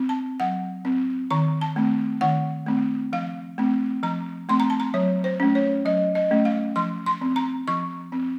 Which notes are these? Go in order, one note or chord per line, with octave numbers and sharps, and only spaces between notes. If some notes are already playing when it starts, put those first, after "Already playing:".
Already playing: C4
A5
F#3 F#5
C4
D#3 A#5
A5
A3 C4
D#3 F#5
A3 C4
F3 F5
A3 C4
F3 A#5
A3 C4 C6
A#5
A5
A#5
F#3 C#5
C5
A3 C#4
C#5
F#3 D#5
D#5
A3 C#4
F5
F3 C6
C6
C4
A#5
F3 C#6
C4